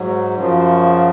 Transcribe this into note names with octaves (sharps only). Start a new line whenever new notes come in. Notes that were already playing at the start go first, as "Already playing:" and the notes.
Already playing: G#2 F#3
F#2 C#3 F3